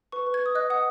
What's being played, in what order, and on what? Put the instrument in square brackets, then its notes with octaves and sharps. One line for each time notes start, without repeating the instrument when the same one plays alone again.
[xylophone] B4 C#6
B4
G#6
B4 D#6
D#5 F#6
F#5 D#6